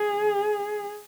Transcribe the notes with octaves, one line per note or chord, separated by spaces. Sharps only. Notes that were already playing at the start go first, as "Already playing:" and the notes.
Already playing: G#4